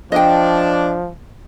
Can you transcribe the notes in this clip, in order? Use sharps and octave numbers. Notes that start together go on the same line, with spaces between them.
F3 D4 D#5 G5